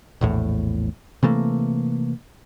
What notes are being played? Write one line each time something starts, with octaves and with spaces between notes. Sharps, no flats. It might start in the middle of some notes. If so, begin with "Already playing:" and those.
A#1 E2 A2
C3 E3 A3 A#3